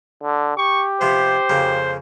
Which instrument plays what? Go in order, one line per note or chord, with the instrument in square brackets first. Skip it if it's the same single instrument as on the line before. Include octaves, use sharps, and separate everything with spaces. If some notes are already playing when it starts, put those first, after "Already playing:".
[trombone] D3
[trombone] G4 [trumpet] C#6
[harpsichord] C3 F3 B3 [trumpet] C5
[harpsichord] F2 C#3 A#3